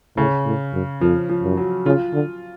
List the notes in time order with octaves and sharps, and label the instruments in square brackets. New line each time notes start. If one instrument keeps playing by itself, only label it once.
[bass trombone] A2 [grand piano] C#3
[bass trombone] A2
F#2
[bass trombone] F2 [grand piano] F3
[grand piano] F3
[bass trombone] F#2
[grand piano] F#3
[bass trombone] C#3 [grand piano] F4
[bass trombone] D3